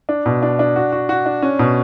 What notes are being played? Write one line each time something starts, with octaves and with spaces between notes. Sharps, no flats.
D4
B2
D4
D4
F#4
F#4
F#4
D4
C#4
B2